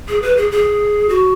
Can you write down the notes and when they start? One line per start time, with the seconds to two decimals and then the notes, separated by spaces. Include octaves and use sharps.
0.08 G#4
0.22 B4
0.37 G#4
0.51 G#4
1.09 F#4